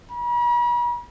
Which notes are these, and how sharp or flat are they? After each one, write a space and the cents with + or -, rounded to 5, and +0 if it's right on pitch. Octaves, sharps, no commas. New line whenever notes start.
B5 -45